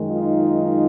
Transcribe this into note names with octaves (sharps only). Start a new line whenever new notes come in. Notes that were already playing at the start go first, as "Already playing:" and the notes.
Already playing: F#2 D#3 G#3
D#4 F4